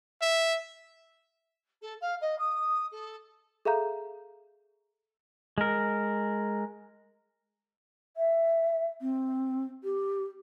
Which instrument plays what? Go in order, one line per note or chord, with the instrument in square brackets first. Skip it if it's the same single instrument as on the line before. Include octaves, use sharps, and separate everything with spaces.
[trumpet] E5
[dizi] A4
F5
D#5
D#6
A4
[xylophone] G#4 A4 E5 F5 A#5 G6
[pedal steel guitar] G#3 A#4
[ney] E5
C4
G4